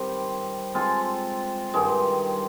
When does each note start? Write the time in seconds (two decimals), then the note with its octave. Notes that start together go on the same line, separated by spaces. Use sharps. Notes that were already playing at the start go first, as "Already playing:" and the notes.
Already playing: D#3 G3 C4
0.74 G#3 C4 F4 A4
1.74 G2 D#3 G#3